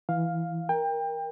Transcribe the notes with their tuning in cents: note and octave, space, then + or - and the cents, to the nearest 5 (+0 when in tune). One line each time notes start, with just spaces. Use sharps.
E3 +0 F5 +5
A#4 +5 G5 +25